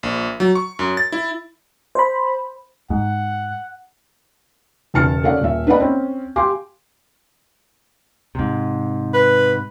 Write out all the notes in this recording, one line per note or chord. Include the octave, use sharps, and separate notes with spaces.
A#1
F#3
C#6
F#2
A6
E4
C5 B5
G#2 F#5
E1 E2 C#3 A5 F6 C#7
C#4 A4 D5 F5 F#5
D#1 E5
D4 B4 D#5 F#5 B5
C4 C#4
G4 F5 G#5 C6 D6
G#2 C3
B4